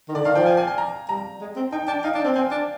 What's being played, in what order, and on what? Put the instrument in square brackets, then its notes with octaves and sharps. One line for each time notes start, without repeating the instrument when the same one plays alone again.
[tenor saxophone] D#3
[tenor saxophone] D3 [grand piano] D5
[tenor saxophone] D#3 [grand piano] F5
[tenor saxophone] F3 [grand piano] G5
[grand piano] G#5
G#5
G#5
A#5
[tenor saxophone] G3 [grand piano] A#5
[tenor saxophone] G#3
C4
[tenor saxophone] D#4 [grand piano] G5
[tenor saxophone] D4 [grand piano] G5
[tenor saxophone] D#4 [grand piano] F5
[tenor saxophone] D4
[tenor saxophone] C4 [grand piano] G5
[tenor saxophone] C4 [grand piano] G#5
[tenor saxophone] D4